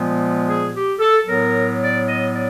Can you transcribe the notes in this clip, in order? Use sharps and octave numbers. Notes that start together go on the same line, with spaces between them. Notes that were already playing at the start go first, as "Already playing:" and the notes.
Already playing: A#2 F3 G#3 B3
G#4
G4
A4
A2 F#3 B3 A#4
D5
D#5
D5